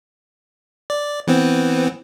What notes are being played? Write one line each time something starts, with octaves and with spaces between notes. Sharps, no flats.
D5
E3 B3 C4